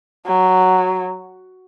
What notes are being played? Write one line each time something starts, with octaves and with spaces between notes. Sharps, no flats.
F#3